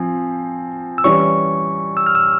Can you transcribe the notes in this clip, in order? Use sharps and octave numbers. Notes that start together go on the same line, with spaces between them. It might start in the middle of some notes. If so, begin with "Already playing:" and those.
Already playing: F3 C4 G#5
E6
E3 G3 C#4 C#6
E6
F6
E6